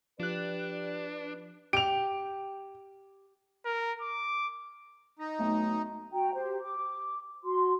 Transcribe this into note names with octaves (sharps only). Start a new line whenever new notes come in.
F3 D4 G4 B4 D5 F#6
G4 D7 F7
A#4
D6
D#4 A#6
B1 A3
F#4 G5 A#5
G4 C5
D6
F#4 C6